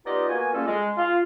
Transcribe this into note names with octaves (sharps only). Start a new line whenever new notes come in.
B3 D#4 F4 G4 D5 D#5
A#3 B3 F#4 G#5
G3 A3 A#3 C#4 F4 A4
G#3
F4